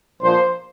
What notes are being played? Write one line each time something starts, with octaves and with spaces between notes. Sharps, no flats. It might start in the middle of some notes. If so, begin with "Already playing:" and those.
A#1 A#2 F3 A#3 C5